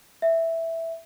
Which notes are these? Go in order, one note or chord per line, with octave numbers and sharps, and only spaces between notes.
E5